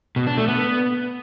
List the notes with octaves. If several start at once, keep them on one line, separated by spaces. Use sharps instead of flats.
B2
D4
A3
B3